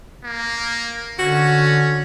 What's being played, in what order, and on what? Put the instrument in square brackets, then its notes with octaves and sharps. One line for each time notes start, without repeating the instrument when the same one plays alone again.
[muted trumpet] A#3
[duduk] D3 [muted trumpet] C#4 [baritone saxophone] F#4